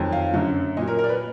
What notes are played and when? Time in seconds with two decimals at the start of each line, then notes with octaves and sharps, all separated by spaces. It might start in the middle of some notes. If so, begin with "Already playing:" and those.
Already playing: F2 D#3 F#3
0.12 F5
0.34 F#2 D3 F#3
0.77 A#2 F#3 D#5
0.87 A#4
0.98 A#4
1.04 D5
1.09 B4